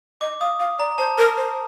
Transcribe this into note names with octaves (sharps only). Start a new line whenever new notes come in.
D#5 D6
F5 D#6
F5
D5 A#5
C5 A5
A#4
C5